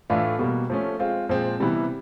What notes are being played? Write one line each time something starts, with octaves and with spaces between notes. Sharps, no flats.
A2 E3 A3 D4 F4
B2 G3 A#3
F3 A3 C#4
G#3 C4 F4
A#2 F3 G#3 C4
C3 E3 G3 B3 E4